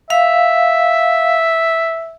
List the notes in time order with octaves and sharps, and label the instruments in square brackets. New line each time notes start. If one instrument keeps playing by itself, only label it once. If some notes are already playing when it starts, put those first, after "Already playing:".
[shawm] E5 [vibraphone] F5